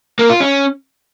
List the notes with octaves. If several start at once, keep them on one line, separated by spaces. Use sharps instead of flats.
A#3
F4
C#4